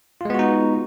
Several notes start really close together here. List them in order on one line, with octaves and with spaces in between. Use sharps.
F4 G#3 B3 F#4 D#4